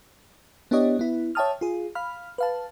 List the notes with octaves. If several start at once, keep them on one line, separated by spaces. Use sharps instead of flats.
B3 D4 E4 G4 C#5 D#5
B3 E4
C#5 E5 G5 A5 D#6 F6
F4 G#4
F5 B5 F6
B4 F5 A5